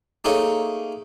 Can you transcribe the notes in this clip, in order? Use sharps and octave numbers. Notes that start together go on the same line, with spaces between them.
A3 A#3 D#4 G#4 C#5